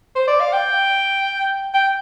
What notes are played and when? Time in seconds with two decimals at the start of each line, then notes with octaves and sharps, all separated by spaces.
0.16 C5
0.27 D5
0.40 F5
0.53 G5
1.74 G5